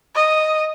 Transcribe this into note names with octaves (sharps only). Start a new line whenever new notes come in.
D#5